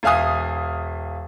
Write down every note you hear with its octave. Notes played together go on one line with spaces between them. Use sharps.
E1 E5 F5 G#5 D#6